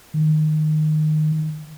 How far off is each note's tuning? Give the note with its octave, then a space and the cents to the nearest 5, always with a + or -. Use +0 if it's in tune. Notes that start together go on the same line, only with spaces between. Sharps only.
D#3 -15